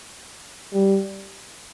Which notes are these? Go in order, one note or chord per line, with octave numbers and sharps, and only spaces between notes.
G3